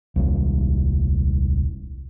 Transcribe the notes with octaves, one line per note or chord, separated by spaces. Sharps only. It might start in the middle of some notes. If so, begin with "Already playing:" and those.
D#1 C2